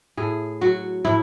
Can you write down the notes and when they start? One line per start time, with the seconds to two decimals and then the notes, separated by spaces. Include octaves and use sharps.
0.17 A2 G#4
0.61 F#3 F#4
1.05 A2 E4